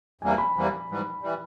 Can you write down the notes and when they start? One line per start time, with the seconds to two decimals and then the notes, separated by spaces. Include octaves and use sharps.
0.21 E2 C3 E3 G3 A#3 G#5
0.38 B5
0.55 E2 C3 E3 G3 A#3
0.89 G#2 E3 G3
1.22 E3 G3